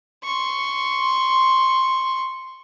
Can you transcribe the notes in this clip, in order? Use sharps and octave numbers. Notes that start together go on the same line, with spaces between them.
C6 C#6